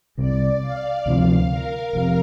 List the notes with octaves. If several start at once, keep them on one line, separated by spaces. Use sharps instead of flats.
C2 C3 G3 D5
F5
D2 C3 F3
A#4
F1 F2 C3